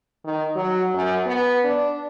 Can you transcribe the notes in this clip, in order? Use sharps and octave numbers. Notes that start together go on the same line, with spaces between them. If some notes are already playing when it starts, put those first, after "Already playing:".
D#3
F#3
F#2
B3
D4